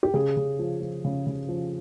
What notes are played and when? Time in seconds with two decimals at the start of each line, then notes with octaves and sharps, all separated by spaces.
0.03 G4
0.14 C#3 G#4
0.37 C#3
0.59 F3
0.81 F3
1.05 C#3
1.27 C#3
1.49 F3